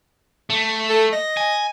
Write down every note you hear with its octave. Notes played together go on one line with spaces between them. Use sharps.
A3
A4
D#5
G#5